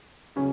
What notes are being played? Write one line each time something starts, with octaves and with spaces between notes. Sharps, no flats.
C#3 F#3 C#4